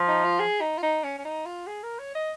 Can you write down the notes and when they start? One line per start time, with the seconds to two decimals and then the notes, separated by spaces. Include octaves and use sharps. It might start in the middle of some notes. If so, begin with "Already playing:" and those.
Already playing: F3
0.08 D#4
0.24 F4
0.40 G#4
0.61 D#4
0.78 F4
0.82 D#4
1.03 C#4
1.18 C#4
1.25 D#4
1.46 F4
1.67 G#4
1.83 A#4
1.99 C#5
2.15 D#5